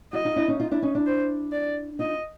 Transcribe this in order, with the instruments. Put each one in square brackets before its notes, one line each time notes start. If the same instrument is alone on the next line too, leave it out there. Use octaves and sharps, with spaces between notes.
[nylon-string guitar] E4 F#4 [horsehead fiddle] D#5
[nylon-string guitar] D#4 F4
D4 E4
C#4 D#4
D#4 F4
D4 E4
C#4 D#4
D4 E4
[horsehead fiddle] C5
D5
[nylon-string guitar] D#4 F4 [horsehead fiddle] D#5